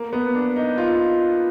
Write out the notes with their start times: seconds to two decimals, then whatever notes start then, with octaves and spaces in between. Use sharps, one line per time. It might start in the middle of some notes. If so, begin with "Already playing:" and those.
Already playing: A#3
0.13 B3
0.35 D4
0.56 D#4
0.78 F4